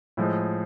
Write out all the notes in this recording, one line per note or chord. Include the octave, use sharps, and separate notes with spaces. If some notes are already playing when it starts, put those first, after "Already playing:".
A2 F3 G#3